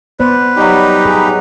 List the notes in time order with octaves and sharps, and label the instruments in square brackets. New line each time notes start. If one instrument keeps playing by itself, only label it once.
[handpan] B3 C5 D5 [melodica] B4
[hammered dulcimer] F#3 G3 [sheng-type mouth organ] D#4 G4
[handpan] G#4